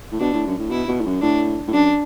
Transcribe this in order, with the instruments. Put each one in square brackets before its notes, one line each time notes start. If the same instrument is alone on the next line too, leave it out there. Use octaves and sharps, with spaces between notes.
[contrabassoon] A2
[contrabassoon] B2 [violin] D4
[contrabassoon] A2
F#2
A2
[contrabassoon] B2 [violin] E4
[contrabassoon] B2
A2
F#2
[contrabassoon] A2 [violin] D4
[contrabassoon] A2
[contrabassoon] F#2 [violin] D4